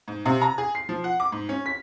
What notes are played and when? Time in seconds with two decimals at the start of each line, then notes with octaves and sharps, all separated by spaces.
0.08 G#2
0.26 C3
0.41 A#5
0.58 G#4
0.75 C7
0.89 F3
1.04 F#5
1.20 D6
1.32 G#2
1.49 C#4
1.66 B6